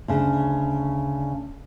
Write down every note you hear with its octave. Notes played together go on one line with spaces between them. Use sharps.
D2 C#3 D4